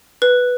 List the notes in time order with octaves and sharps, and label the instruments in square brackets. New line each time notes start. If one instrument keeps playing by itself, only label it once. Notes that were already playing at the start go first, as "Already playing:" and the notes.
[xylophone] B4